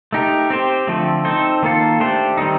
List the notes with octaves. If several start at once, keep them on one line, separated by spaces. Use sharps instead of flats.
A3 D#4 G4 A#4
C4 G4 C5
D3 F3 A3 C4
C4 D#4 A4 C5
D#3 A#3 F4 A4
A3 D4 G4 C5
D#3 G3 C4 D#4